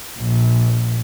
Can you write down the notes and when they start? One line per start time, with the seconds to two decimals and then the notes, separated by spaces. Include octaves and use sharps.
0.18 A#1